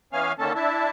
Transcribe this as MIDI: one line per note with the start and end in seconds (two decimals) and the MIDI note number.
0.13 0.32 52
0.13 0.32 59
0.13 0.32 61
0.13 0.32 77
0.13 0.32 80
0.13 0.32 89
0.39 0.53 50
0.39 0.53 51
0.39 0.53 58
0.39 0.53 61
0.39 0.53 69
0.39 0.53 81
0.55 0.90 62
0.55 0.90 64
0.55 0.90 76
0.55 0.90 81